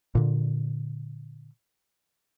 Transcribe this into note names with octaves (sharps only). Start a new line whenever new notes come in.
A#2 D3